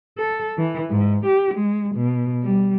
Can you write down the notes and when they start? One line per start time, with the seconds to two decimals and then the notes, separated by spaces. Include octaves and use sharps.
0.18 A4
0.58 E3
0.90 G#2
1.26 G4
1.54 G#3
1.96 B2
2.44 G3